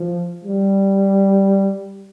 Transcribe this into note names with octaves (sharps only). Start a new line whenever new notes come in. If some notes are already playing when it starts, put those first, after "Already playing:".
Already playing: F3
G3